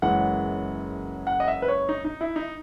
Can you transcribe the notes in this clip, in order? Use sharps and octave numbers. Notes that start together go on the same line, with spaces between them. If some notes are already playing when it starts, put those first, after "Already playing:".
F#1 F#2 E3 G#3 F#5
F#5
D#5
E5
B4
C#5
D#4
D#4
E4
D#4